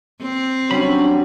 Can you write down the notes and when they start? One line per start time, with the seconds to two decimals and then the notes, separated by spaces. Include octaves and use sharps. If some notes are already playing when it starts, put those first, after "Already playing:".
0.22 C4
0.71 F#3 G3 C#4 D4 B5